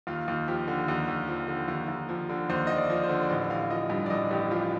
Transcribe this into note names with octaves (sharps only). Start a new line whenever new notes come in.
D#2 F4
D#2
F3 G4
D3
D#2
D#2
F3
D3
D#2
D#2
F3
D3
D#2 C5
D#2 D#5
D5
F3
C5
D3
D5
A1 D#5
A1 F5
F3 D#5
G2
D5
A1 D#5
A1 G4
F3 F4